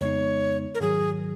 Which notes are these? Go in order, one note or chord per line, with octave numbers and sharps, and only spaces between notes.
F2 C#3 G#3 B3 D#4 C#5
A#4
G#2 D#3 F#3 G#4